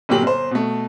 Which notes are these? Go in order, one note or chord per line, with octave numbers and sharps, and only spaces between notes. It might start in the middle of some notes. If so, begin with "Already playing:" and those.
G1 A#2 F#3 G4 F#7
G1 C5
B2 A3